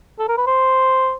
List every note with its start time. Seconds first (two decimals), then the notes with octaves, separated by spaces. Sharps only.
0.19 A4
0.28 A#4
0.37 B4
0.47 C5